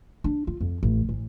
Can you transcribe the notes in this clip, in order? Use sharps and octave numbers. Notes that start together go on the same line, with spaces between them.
D4
F4
F2
A1
A1